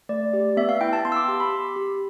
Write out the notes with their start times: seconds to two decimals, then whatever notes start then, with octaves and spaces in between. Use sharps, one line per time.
0.09 A3 D5
0.33 G4
0.57 B3 E5
0.69 F5
0.81 E4 G5
0.93 A5
1.05 B3 C6
1.12 E6
1.16 D6
1.28 G4 C6
1.40 B5
1.53 G4
1.76 G4